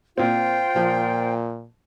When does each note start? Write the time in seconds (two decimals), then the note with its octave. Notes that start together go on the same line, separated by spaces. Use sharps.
0.18 A#2 C4 F4 C5 G5
0.76 A#2 F3